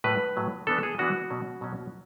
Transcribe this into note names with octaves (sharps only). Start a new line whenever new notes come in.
A2 F#3 A3 B4
A2 F#3 A3
E3 B3 D4 A4
G#4
E3 B3 D4 F#4
B2 F#3 C#4
B2 F#3 C#4